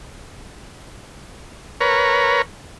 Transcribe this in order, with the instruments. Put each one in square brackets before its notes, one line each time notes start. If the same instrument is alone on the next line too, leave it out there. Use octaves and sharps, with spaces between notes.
[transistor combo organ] A#4 B4 C#5